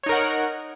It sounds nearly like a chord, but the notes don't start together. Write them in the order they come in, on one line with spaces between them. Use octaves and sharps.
C#5 D#4 A#4 F#5